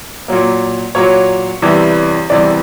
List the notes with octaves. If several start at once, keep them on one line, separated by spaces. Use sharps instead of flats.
A#2 F#3 A#3
A#2 F#3 A#3 C#5
E2 C3 E3 G3
E2 C3 E3 G3 D5